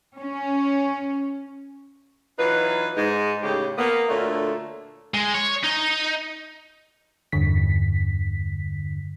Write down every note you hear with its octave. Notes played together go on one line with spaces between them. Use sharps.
C#4
E3 F#3 D#4 F4 B4
G#2 G#3 D#4
A2 C#3 G4
A#3 B3
D2 A#2 D3 A3 F4 C#5
G#3
C#5
D#4
E2 G2 D3 B6